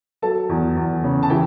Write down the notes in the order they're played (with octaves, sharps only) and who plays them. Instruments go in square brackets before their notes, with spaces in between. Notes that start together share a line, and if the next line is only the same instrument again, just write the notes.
[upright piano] F#3 A4 A5
E2
E2
C#3
A5
E3 G4 G5